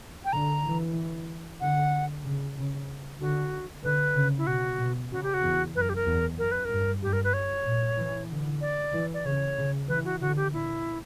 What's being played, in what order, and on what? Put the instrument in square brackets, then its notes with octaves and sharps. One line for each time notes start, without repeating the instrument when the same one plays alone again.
[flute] G5
[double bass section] D3 [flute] A#5
[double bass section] E3
[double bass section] D3 [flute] F#5
[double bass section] C#3
C#3
[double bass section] D3 [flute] F#4
[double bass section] D3 [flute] B4
[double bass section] C#3
[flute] E4
[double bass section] B2 [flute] F#4
[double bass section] B2
[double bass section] C#3 [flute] F#4
[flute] G4
F#4
[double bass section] E2
[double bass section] F#2 [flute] B4
[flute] A#4
G4
A#4
[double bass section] E2
[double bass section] F#2 [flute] A#4
[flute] B4
A#4
[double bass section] G2
[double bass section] G2 [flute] G4
[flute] A#4
B4
C#5
[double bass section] A#2
E3
D3
[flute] D5
[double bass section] E3
[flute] D5
[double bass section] C#3 [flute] C#5
[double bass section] C#3
[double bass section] E3 [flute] B4
[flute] F#4
[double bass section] D3 [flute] F#4
[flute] G4
[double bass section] A#2 [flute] E4